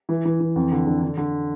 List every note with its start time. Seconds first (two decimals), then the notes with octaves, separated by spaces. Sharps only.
0.09 E3
0.25 E3
0.40 E3
0.56 F2
0.72 D3
0.86 D3
1.02 D3
1.17 D3